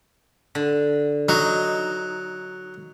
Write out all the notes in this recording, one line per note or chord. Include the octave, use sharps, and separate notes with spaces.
D3
F#3 D#4